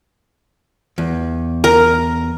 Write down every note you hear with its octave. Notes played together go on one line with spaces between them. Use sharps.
E2
A#4